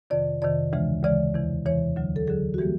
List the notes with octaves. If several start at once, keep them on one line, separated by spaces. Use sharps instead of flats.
F2 C3 D#3 D5
F2 C3 D#3 D5
D2 C#3 E3 G#3
D2 C#3 E3 G#3 D5
E2 C3 E3
E2 C3 E3 C#5
D2 D3 F#3
A4
D2 D3 F#3 G#4
F#4
E3 G3 A#3 G4